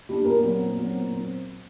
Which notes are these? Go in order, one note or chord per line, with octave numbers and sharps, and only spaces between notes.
G3 A#3 D4
A#2 A#4
F#3 C4
A#2
F#3 C4
A#2
F#3 C4